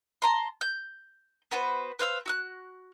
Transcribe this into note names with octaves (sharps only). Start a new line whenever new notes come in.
A5 A#5 C6
G6
B3 F#4 B4 C5
B4 C5 F5 E6
F#4 E6 F#6